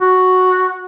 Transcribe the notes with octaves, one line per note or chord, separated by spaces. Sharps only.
F#4